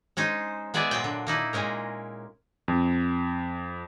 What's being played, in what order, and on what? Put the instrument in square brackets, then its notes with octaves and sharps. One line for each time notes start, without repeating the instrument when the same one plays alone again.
[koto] G#3 C#4 D#4 C5
G#3 B3 G#4 D5 E5
A#2 F#3 G5
D3
A#3 D#4 E4
A#2 G#3 C#4 A#4
[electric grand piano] F2